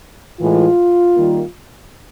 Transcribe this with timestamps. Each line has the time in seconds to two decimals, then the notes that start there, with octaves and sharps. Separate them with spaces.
0.41 A2 E3 G#3 F4
1.15 D#3 G3 A#3